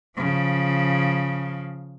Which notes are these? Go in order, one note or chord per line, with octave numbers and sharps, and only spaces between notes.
C#3 F3